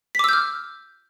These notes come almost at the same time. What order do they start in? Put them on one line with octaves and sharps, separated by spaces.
B6 D6 E6 G6 F6